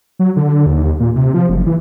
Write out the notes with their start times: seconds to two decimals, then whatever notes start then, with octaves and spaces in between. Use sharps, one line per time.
0.19 F#3
0.36 D3
0.66 D#2
1.00 A#2
1.16 C3
1.34 F3
1.49 F#1
1.67 E3